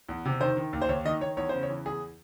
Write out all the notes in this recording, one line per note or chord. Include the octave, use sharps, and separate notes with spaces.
E2
C3
D#3 C5
D#3
D#2
C5
D#2 C#5
D#3 D#5
D#3 C#5
E2 C#5
C#3 C5
C#5
E3
E2 G#4